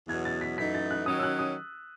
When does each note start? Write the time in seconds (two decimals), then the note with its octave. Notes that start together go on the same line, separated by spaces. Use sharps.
0.08 E2 B2 F#3 G#6
0.25 A6
0.41 B6
0.58 F#2 E3 A3 D#4 B6
0.74 A6
0.91 F#6
1.06 D#3 F#3 C#4 D#6
1.19 E6
1.23 F#6
1.39 D#6